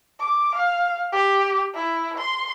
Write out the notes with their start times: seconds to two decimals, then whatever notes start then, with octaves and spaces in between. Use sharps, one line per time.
0.20 D6
0.55 F5
1.12 G4
1.75 E4
2.18 C6